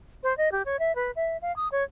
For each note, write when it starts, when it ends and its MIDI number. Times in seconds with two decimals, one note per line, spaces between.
0.23 0.36 72
0.38 0.51 75
0.52 0.62 67
0.66 0.79 73
0.79 0.95 76
0.95 1.11 71
1.16 1.37 76
1.42 1.55 77
1.56 1.68 87
1.72 1.84 73